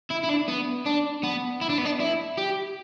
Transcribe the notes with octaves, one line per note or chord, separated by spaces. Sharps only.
E4
E4
D4
B3
D4
B3
E4
D4
B3
D4
E4
G4